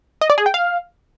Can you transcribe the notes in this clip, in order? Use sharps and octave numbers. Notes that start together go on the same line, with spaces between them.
D#5
D5
G#4
G5
F5